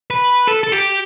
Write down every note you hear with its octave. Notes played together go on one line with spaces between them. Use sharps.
B4
A4
A4
G4